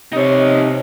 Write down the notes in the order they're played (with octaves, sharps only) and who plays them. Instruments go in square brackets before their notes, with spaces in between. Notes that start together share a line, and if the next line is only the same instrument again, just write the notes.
[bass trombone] C3 [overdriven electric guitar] D#4 C#5